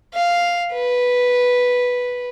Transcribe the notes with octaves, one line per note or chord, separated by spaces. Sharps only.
F5
B4